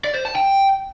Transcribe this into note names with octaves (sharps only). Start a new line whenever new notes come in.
D5
C5
A5
G5